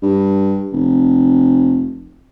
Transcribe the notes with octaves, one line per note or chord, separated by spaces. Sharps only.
G2
F1